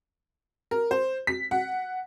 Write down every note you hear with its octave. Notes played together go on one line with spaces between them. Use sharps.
A#4
C5
B6
F#5